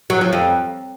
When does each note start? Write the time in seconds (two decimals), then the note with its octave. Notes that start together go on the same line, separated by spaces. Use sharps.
0.10 F#3
0.21 F3
0.33 F2